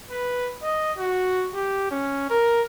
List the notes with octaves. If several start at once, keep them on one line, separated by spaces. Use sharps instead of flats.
B4
D#5
F#4
G4
C#4
A#4